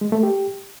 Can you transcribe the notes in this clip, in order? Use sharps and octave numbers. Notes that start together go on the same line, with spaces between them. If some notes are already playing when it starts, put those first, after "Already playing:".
G#3
A3
G4